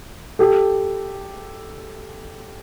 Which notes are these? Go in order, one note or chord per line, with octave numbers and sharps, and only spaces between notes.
G4 A4